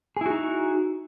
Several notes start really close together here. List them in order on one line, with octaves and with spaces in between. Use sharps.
G#4 E4 F#4 D#4